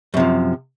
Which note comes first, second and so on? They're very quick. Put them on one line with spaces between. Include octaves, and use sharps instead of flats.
F#2 C3 F3